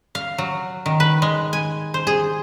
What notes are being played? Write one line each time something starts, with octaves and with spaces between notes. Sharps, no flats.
F5
F#3
D#3
B4
G#3
G#5
C5
G#4